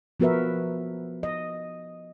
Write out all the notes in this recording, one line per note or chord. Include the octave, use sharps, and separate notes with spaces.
F3 B3 F#4 A#4 B4 E5
D#5